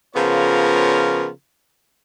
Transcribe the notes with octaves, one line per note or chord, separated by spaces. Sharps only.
C#3 F3 B3 F4 A#4 C#5